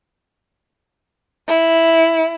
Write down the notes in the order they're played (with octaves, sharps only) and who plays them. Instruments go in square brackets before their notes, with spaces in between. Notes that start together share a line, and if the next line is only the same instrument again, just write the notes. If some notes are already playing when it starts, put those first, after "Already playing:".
[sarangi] E4